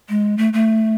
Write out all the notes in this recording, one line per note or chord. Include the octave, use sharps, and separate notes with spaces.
G#3
A3
A3